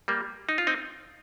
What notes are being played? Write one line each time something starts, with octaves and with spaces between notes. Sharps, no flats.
G3 A#3
D#4
F4
C4 D#4